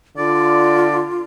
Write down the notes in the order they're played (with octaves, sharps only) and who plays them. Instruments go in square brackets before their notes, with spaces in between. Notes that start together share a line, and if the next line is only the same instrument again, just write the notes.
[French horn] D3 [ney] F4 [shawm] D5